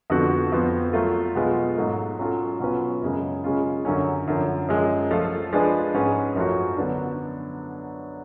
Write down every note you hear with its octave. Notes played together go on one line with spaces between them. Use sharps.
F2 D3 F3 B3 F#4
F2 F3 B3
F#3 A3 F4
B2 G#3 B3 F4
G#2 F#3 A3
F#3 C#4 F4 A4
B2 F#3 C#4 F4 B4
F#2 C#3 G#3
C#3 G#3 C#4 F4
F#2 D3 F#3 C#4
F#2 D3 F3
F#2 F3 G#3
F3 A3 F4 A4
F3 G#3 D4 G#4 B4
G#2 G#3 C#4 G#4 B4
F#2 F3 A3 C#4 F#4
D3 F#3 B3 D4